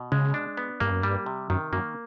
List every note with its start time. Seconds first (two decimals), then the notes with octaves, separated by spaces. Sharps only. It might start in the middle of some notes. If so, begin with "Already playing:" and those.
Already playing: B2
0.12 C#3 G#3
0.34 D4
0.57 B3
0.80 G2 A#3
0.91 F#2
1.02 G2 G3
1.26 C3
1.50 F#2 D#3
1.73 F#2 A#3